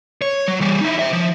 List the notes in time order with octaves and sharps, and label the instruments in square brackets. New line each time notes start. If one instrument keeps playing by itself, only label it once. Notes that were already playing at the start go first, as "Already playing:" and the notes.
[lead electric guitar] C#5
F#3
E3 G3
D#4 E4
C5 E5
F3